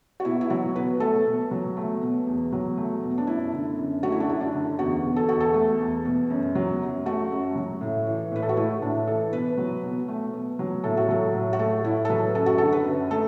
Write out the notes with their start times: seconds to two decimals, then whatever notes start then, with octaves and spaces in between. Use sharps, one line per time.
0.20 F#4
0.25 B2 E4
0.41 E4
0.50 F#3 F#4
0.76 B2 B4
1.00 A3 A4
1.26 B2
1.51 F#3
1.77 A3
2.02 B2
2.27 E2
2.52 F#3
2.78 A3
3.03 B2
3.18 D4
3.27 F#2 E4
3.52 D3
3.78 F#2
4.03 A3 F#4
4.12 E4
4.20 D4
4.28 F#2 E4
4.41 D4
4.54 D3
4.79 E2 F#4
5.04 B2
5.16 A4
5.29 E2 F#4
5.40 A4
5.54 A3
5.80 E2
6.05 B2
6.30 F#2
6.55 F#3
6.80 F#2
7.06 A3 F#4
7.32 F#2
7.56 F#3
7.81 A2
8.07 E3
8.32 A2 B4
8.43 A4
8.49 F#4
8.56 A3 E4
8.82 A2 D4
9.07 E3 A4
9.32 B2 B4
9.57 F#3
9.83 B2
10.08 A3
10.33 B2
10.59 F#3
10.84 A2 A4
10.97 F#4
11.08 F#3 A4
11.34 A2
11.53 F#4
11.59 A3 A4
11.85 A2 E4
12.05 A4
12.09 F#3 B4
12.35 F#2 A4
12.46 F#4
12.58 D3 A4
12.72 B4
12.86 F#2
13.10 A3 A4